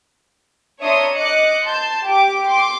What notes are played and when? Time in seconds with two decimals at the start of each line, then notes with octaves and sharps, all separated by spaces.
0.81 D4 C#5 E5 A#5 C6 D#6
1.15 D#5 D6 F#6 C#7
1.66 A5 C6 G6
2.06 G4 D6
2.48 C6 D6